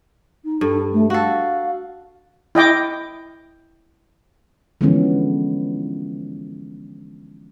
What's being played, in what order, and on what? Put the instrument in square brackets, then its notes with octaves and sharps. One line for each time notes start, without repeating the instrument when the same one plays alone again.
[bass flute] D#4
[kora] G2 [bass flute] A4
[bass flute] A3
[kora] F#4 A4 [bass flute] F5
[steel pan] E4 D#5 G5 D6
[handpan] D3 E3 F3 G#3 B3 C#4